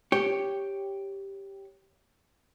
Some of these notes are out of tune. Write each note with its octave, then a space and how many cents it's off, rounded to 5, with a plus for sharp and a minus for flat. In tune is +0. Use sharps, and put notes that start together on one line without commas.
G4 +0 C#5 +0